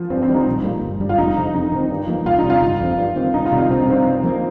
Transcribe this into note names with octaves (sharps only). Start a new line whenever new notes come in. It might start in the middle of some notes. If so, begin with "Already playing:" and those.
Already playing: F3
G2 C4
C4
D#3 G3
D#4
A#1
A#2 G3 A#3
G1
G2 G3
F4
F1 D#4
F2 C3
F2 D#4
D#3 G3 C4
G2
F3 A#3
C2 F4
D#4
C3 G3
F4
G1
F2 F3
G2
D#3 C4
C2 D#4
F4
C3 D#3 G3
F4
C2 C4
D#4
C3 D#3 G3 C4
G2
F3 A#3